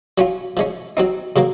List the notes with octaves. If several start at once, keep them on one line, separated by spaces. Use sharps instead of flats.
F#3 C#4 F4
F3 G#3 C#4
F#3 C4 D#4
C#3 F#3 A#3